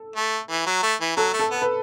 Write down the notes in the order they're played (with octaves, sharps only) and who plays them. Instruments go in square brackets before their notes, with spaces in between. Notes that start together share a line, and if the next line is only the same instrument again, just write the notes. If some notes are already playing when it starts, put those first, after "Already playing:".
Already playing: [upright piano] A4
[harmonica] A3
E3
F#3
A3
E3
[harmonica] F#3 [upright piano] A4
[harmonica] A3
[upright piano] A4
[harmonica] B3
[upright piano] B4